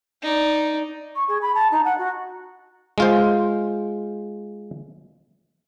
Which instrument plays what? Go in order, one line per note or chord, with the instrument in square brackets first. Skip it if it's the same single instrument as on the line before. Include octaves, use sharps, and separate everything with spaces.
[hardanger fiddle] D#4 D5
[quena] C#6
G#4
B5
A5
D#4
F#5
F#4
[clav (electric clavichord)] G#3 F4 C5